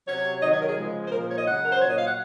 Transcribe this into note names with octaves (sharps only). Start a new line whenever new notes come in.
C3 F#3 C#5
C3 D#3 F#3 D#5
C#5
A#4
G#4
C#3 F3 G#3
C5
A#2 F3 G#3 A#4
C#5
D#5
C#3 F#3 F#5
A#4
C5
A#2 F#3 C#5
D#5
F5
F#5